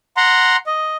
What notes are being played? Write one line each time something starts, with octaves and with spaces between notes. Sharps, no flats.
F#5 A#5 C6
D#5